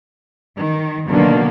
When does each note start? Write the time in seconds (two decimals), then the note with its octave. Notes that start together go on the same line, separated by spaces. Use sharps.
0.58 D#3
1.07 B2 D3 D#3 F#3 A#3